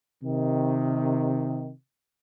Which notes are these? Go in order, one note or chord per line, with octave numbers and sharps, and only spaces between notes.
C3 D#3